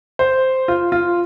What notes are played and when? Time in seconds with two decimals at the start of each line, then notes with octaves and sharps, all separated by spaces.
0.19 C5
0.68 F4
0.92 F4